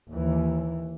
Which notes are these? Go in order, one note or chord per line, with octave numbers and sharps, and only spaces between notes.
D#2 E3